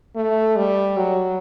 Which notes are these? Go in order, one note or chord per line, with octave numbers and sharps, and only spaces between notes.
A3
G3
F#3